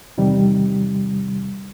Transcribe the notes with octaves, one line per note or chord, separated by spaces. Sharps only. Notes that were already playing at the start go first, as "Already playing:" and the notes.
E2 C3 D#3 G3